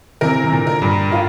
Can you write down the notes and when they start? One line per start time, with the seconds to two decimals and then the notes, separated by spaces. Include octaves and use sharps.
0.21 C3 E3 A#4
0.44 C3
0.52 A#2 D3
0.67 A#4
0.82 G2 A#2
1.12 A2 F4